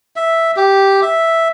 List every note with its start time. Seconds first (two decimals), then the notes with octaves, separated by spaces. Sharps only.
0.16 E5
0.56 G4
1.02 E5